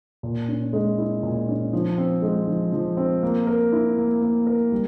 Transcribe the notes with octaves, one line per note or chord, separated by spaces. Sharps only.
A#2
C#4
G#3
E4
A#2
C#4
F3
C4
G#3
F3
F3
C4
A#3
A#4
E4
A#3
A#3
A#4
G3